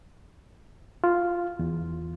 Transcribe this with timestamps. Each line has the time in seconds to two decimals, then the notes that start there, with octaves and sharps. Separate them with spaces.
1.04 F4
1.59 E2